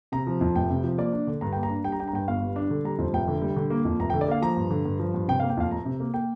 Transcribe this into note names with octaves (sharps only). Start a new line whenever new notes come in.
C3 A#5
F3
F2
F1 G5
C3
F3
A#3 D5
D4
D3
G2 A#5
A#3 G5
A#5
D4
G3 G5
A#5
D4 G5
A#5
G2 G5
G1 F5
G3
D4
D3
G3 A#5
F2 C5
F1 G5
D3
G3
D3
A#3
F2
F1 A#5
G5
D3
D5
A#3 F5
F3 A#5
G2
D3
G2
F3
G2
C3 G5
F5
A#3
G5
F2 F5
F1 A#5
C3
A#3
A#3 G5